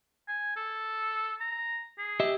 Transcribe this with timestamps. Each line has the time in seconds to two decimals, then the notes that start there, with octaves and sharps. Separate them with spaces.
0.28 G#5
0.57 A4
1.40 A#5
1.98 G#4
2.20 G4 D#5 E5